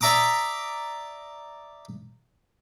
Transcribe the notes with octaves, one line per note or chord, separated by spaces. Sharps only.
D5 E5 A#5 D6 D#6